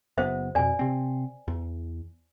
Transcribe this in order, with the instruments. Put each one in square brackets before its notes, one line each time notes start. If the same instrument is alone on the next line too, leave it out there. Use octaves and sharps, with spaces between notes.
[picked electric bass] F#1 B3 [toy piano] C5 E5
[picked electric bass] F2 B2 [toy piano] D5 G#5
[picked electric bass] C3 C4
E2